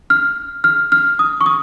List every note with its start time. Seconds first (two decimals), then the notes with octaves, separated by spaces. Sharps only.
0.10 F6
0.64 F6
0.92 F6
1.19 D#6
1.41 C#6
1.46 D#6